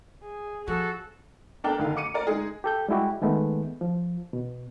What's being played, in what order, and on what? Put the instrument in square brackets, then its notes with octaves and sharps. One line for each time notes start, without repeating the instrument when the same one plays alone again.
[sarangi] G#4
[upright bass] F3 [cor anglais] F#4 [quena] A4
[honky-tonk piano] B3 D4 A4 A#4 G5 A5
F#1 D3 D#3 F5
D6 C#7 D#7
A#4 D5
G#3 D#4 G#4
[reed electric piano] G4 A4 G6
G3 G#3 E4 F#4 G4
D#3 G#3 A3 B3
F3
B2